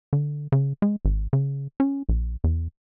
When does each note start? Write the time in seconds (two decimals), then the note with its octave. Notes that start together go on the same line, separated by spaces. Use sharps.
0.13 D3
0.52 C#3
0.82 G#3
1.05 G#1
1.33 C#3
1.80 C#4
2.09 A#1
2.44 E2